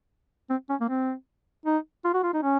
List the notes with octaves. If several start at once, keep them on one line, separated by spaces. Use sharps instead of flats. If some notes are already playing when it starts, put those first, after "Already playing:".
C4
C#4
A#3
C4
D#4
F4
F#4
F4
D#4
C#4